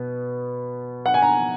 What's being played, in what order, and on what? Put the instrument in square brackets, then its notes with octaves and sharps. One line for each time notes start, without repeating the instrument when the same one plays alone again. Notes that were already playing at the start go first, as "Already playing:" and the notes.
Already playing: [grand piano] B2 B3
F#5
G#5
A#5